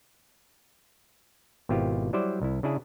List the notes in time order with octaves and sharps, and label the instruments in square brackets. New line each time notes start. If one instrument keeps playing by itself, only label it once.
[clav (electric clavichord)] G#1 B2 C4 E4 F4 G4
F#3 G3 E4 C5 D5
C2 E4
C#3 D4 E4 G#4